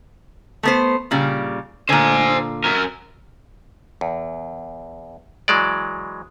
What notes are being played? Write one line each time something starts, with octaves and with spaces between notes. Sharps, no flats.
A3 B3 C5
A#2 C#3 G3
A#2 D3 C5 G#5
F#2 A#4
E2
E3 F#3 G#3 D5